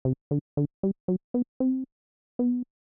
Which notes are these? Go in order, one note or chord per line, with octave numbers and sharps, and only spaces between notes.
C3
D3
D3
G3
F#3
B3
C4
B3